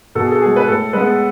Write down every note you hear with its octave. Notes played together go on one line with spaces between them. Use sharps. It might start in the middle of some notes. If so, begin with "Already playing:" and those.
B2 A4
G#4
A4
G#3 B3 G#4
B4
A2 A4
G#3 B3 B4